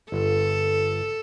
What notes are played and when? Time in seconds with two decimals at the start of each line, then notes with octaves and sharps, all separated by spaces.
0.12 G1 A4